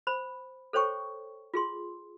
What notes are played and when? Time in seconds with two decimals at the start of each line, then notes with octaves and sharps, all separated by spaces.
0.07 C5 B5
0.73 A4 C5 C#5 G5 C#6
1.54 F4 G#4 C6